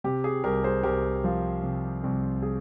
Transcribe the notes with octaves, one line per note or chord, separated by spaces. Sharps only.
C3 G4
G#4
C2 G4 A#4
G#4 C5
C2 G4 A#4
F3
C3
C2
G#4